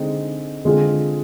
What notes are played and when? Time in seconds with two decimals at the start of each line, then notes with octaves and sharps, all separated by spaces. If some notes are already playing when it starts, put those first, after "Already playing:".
Already playing: D3 G#3 C4 D#4 G#4
0.65 D3 G#3 C4 F4 G#4